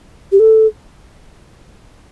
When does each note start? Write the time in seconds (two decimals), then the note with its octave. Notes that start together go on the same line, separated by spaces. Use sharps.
0.32 G4
0.39 A4